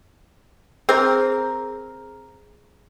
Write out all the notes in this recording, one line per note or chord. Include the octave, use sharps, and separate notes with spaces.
C4 G#4 A#4